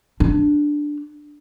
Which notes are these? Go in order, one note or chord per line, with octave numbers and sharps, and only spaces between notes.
D4